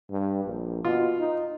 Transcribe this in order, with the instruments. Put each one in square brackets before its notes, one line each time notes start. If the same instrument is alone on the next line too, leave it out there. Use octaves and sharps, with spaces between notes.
[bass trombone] G2
A#1
[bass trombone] B2 [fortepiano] F4
[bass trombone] D#4